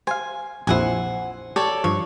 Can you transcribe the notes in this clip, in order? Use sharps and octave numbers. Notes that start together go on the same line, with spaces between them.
C5 F5 G#5
A#1 F2 E4 C5 F#5 G#5
A4 C#5 D5 G5 A5
G2 F3 C#5